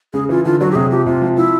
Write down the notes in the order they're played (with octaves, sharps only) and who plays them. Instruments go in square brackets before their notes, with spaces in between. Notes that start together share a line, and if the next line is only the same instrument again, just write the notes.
[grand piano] C#3 [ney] G#4
[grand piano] E3 [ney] F4
[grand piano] D3 [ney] F4
[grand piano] F#3 [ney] F#4
[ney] G4
[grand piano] C3 [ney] G#4
[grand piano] F3 [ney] G4
[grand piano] C3 [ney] F4
[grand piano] F3
[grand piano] F3 [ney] E4